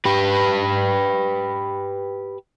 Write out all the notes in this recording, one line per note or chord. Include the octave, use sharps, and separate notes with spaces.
G4 B4